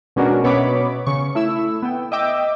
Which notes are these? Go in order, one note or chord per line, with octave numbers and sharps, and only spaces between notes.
B2 G#3 C#4 D4 F#4 A#4
B2 B3 C#5 E5 B5 D6
C#3 C#6
A3 E4 E6
B3 G5
D#5 E5 G5 D6 E6